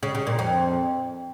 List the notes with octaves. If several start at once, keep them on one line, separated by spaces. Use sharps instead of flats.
C#3
C#3
A#2
F2